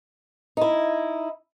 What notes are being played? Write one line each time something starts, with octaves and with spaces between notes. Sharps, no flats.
D#4 E4